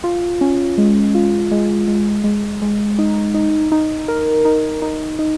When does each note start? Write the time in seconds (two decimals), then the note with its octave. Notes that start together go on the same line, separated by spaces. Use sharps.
0.04 F4
0.41 C#4
0.78 G#3
1.15 F4
1.51 G#3
1.88 G#3
2.24 G#3
2.62 G#3
2.99 D#4
3.34 D#4
3.72 D#4
4.08 A#4
4.45 D#4
4.82 D#4
5.19 D#4